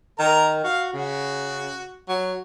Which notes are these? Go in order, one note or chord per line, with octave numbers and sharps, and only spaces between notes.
D#3 A#4 A#5
F#4 F5
C#3 F#4
F#3